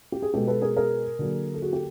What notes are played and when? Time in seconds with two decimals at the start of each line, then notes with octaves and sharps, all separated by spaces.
0.12 G4
0.22 G#4
0.34 B2 G#3 B3 G4 A4
0.48 A4 B4
0.62 G#4 A#4
0.76 G#4 A#4
1.19 D3 F#3 A#3
1.54 A4
1.62 F#4 G#4
1.72 G4 A4